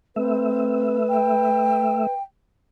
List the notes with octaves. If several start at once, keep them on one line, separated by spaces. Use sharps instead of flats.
A3 C4 B4 E5
G5